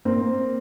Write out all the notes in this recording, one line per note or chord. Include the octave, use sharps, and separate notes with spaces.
A#3 C4